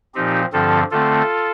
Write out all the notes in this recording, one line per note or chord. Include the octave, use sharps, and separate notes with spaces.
A#2 F3 C4 D#4 G4
G2 D3 F3 C4 F4 A4
D3 A3 C4 F4 A4